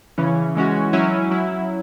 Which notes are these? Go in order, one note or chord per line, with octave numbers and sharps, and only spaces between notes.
C#3 E3 C#4
E3 G#3 C#4 F#4
F#3 C#4 E4
F#3 E4